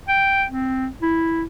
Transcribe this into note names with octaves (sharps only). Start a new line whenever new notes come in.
G5
C4
E4